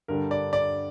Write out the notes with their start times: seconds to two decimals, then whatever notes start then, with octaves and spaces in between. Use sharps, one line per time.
0.08 G2 D3 G3 A#4
0.31 D5
0.53 D5